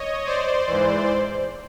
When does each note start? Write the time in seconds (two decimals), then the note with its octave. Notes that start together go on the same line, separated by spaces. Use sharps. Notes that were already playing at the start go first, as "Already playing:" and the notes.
Already playing: C#5 D#5
0.26 C5 D5
0.67 G#2 E3